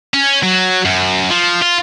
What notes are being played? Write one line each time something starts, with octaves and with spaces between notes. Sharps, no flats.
C#4
F#3
F#2
F3
F4